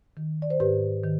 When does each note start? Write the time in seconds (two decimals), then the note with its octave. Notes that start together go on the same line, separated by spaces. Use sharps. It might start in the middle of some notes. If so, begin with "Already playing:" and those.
0.17 D#3
0.42 D5
0.50 C5
0.60 G#2 G4 B4
1.04 D#3